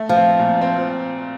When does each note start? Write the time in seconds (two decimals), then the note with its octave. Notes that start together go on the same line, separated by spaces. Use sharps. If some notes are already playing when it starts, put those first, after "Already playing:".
Already playing: A3
0.09 F3
0.16 C4
0.39 A#2
0.61 C4